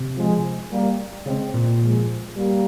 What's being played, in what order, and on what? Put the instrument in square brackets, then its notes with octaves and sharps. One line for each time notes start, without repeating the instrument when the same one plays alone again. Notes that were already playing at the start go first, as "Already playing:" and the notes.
Already playing: [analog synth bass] C3
[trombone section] F3 G#3
G3 A#3
[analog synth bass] C#3 [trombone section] G#3 C4
[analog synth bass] A#2
[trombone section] F3 G#3
G3 A#3